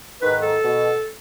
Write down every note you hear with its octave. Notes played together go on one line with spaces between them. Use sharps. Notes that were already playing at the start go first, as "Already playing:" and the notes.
G#2 D#3 B4
A4
B2